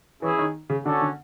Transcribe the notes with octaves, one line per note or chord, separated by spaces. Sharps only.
E3 C#4 E4 G#4 C#5
D#3
C#3
D3 C#4 F#4 A4 D5
D3